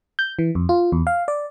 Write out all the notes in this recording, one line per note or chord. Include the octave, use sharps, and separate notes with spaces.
G6
E3
F2
F4
E2
F5
D5